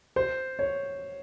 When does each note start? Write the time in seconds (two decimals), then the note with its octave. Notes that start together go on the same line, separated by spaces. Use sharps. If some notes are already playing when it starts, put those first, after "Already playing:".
0.16 C5
0.59 C#5